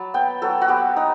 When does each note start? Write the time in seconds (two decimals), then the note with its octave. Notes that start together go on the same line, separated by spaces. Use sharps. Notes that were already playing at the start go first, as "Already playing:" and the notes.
Already playing: F#3 A5 B5
0.14 B3 G5
0.42 F#3 A4
0.61 F#4
0.68 B3 G4
0.96 D#4